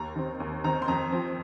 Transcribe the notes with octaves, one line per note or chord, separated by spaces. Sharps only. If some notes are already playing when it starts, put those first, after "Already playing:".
Already playing: D#2 A#5
D#3 C4
D#2
D#3 C4 A#5
C6
F2 A#5
F3 C4